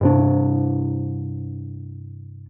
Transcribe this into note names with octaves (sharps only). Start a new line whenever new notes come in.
G2 C3 D4